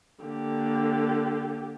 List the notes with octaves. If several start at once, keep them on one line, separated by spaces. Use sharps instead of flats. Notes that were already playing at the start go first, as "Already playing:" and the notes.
D3 A#3 G4